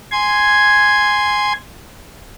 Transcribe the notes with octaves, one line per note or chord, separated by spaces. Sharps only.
G#5 C6 G#6